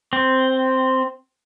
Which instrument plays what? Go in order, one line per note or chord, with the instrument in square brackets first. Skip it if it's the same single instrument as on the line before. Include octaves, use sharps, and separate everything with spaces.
[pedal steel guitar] C4